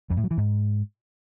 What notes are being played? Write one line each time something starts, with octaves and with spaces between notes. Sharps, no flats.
F2
A2
F#3
E3
G#2